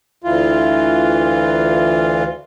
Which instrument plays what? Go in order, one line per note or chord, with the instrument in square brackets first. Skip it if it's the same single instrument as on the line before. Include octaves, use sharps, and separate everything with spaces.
[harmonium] D2 E3 F4